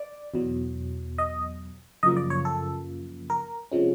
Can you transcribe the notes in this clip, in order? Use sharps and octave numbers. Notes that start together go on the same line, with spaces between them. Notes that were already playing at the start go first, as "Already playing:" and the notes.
Already playing: D5
E2 B2 F#3
D#5
F#2 C#3 F3 A#3 D#5
D5
C#5
A4
A#4
C3 F3 G#3 C#4